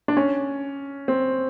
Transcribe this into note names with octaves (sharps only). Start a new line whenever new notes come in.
D4
C#4
C4